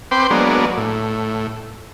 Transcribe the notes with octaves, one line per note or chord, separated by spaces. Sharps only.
C4 B4 G5 C6 D6
F#3 G#3 A#3 B3 D4
A2